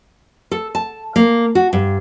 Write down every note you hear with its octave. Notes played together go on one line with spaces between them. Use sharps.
A4
A5
A#3
F#4
G2